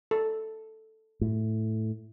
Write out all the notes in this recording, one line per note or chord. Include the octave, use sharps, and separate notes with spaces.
A4
A2